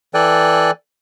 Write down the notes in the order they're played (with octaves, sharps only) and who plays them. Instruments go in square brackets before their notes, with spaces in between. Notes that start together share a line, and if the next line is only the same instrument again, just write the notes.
[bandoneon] E3 A4 D5 G5 G#5 F#6